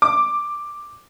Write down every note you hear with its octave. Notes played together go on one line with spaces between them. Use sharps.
D6